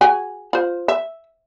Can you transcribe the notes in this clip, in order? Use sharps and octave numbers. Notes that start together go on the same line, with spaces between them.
F#4 G#4 G#5
F4 C5
E5